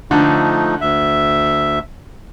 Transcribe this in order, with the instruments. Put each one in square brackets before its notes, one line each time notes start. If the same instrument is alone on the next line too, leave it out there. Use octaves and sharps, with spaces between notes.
[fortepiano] D3 [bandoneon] F3 A3 D#4
[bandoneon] D2 E5